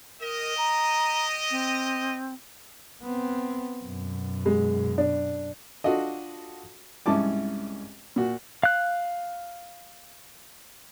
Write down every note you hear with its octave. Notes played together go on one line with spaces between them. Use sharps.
G4 A#4 D#5
A#5
C4
B3 C4
F#2 B2
G#3
D4
D4 F4 F#4 A4 D#5
C2 G#2 C#4 E4 A5 D6
A#2 F#4
F5 F#6